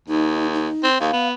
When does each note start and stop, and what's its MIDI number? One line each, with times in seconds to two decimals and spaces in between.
0.08 0.68 39
0.08 0.47 63
0.54 0.87 63
0.84 0.99 60
1.00 1.10 39
1.00 1.28 77
1.13 1.33 59